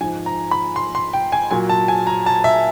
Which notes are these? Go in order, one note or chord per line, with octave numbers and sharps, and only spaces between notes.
G#2 F3 G#5
A#5
B5
C6
C6
G5
G#5
A#2 F#3 G#5
A5
G#5
A#5
A5
E5